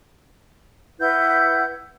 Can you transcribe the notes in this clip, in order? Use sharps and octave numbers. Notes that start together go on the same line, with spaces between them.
E4 B4 F#5 G6